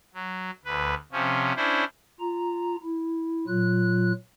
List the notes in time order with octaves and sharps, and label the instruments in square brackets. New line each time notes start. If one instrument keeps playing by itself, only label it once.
[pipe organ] F#3
D2 B4
C3 F3 C#4
C#4 D4 E4 C5
F4 A#5
E4
A#2 F#3 F4 F#6